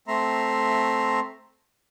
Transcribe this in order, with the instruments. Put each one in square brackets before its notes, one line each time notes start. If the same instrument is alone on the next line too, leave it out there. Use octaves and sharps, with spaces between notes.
[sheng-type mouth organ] A3 C4 E5 A#5 C6